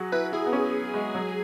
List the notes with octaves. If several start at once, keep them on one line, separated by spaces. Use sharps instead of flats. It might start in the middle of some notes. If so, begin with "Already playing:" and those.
Already playing: F#3 F#4 G#4
E4 B4
E4 G#4
B3
C#4
G#3
F#3